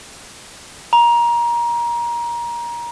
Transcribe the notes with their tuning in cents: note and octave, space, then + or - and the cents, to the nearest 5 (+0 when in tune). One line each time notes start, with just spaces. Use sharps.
A#5 +25